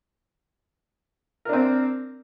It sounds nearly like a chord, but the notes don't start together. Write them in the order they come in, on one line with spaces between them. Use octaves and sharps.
A#4 D4 C4